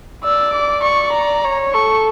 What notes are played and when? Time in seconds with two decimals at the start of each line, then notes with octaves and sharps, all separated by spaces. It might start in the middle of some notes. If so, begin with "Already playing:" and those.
0.24 D5 E6
0.54 D6
0.84 D5 C#6
1.13 A#5
1.44 C#5
1.73 A4 C#6